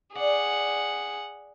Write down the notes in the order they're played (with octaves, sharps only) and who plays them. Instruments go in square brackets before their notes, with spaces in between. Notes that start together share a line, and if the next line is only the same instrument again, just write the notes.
[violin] G#4 F#5 [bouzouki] D5